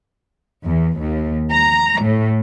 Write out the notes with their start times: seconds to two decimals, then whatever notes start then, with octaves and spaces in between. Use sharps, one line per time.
0.65 E2
1.00 D#2
1.51 A#5
2.01 A2